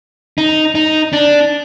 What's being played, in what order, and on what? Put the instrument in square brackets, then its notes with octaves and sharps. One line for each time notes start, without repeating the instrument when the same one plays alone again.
[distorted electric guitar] D#4
D#4
D4